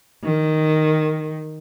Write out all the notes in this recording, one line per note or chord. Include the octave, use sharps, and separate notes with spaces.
D#3